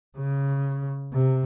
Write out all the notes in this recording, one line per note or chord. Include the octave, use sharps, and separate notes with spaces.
C#3
C3